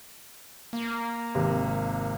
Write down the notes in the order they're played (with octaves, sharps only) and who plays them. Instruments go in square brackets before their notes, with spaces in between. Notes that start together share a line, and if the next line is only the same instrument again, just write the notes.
[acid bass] A#3
[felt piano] G#1 C3